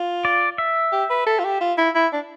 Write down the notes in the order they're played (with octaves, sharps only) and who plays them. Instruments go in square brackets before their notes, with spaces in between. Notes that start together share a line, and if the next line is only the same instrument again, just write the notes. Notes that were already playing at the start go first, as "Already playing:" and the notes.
Already playing: [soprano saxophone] F4
[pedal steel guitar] D5
E5
[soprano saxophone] G4
B4
A4
F4
G4
F4
E4
E4
D4